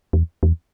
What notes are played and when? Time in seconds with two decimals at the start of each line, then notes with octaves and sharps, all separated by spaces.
0.13 E2
0.43 E2